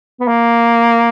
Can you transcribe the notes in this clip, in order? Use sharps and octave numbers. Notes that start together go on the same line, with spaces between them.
B3
A#3